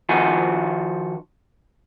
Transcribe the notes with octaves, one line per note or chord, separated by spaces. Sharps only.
D#3 F3 F#4 G#5